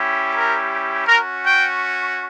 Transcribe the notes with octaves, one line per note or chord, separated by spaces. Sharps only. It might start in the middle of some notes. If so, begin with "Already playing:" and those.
Already playing: G3 C#4 E4 G4
A#4
C#4 F#4 A#4
G5